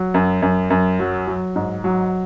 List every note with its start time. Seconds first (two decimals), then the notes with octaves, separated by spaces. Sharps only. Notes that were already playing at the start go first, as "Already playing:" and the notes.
Already playing: F#3
0.14 F#2
0.42 F#2
0.70 F#2
0.99 F#3
1.27 F#3
1.56 G#2
1.84 F#3